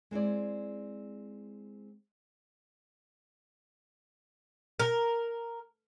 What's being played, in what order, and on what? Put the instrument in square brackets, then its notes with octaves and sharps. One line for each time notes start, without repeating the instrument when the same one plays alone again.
[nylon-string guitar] G#3 C4 E4 D5
[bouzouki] A#4